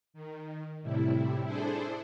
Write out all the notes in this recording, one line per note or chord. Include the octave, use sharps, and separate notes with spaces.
D#3
A2 C3 G3 E4
D4 E4 G#4 A4 C5